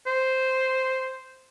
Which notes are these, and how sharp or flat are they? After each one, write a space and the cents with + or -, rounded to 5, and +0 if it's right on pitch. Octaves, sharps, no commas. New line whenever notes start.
C5 -5